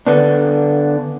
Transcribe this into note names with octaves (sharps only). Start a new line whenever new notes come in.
D3 B3 D4